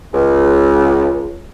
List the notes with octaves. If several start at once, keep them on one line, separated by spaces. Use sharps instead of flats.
C#2